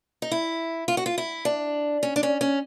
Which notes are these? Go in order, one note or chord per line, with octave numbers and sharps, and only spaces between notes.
D#4
E4
F4
F#4
F4
E4
D4
C#4
D4
C#4
C#4